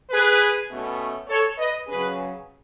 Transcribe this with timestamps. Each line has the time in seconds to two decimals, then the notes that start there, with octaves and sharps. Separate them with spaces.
0.11 G#4 B4
0.70 B2 A3 C#4
1.28 A4 C#5
1.57 B4 D#5
1.87 C#3 F#3 C#4 G#4 B4